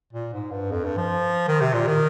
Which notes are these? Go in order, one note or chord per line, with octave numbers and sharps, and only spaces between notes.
A#2
G#2
G2
F2
G2
F3
D#3
C3
A#2
D#3